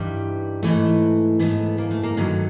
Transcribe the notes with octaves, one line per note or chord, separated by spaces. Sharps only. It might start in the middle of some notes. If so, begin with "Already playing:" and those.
Already playing: G2 E3 G3 D#4
G#2 E3 A3
G#2 E3 A3 B3
A#3
A3
A#3
G2 D#3 F#3 A3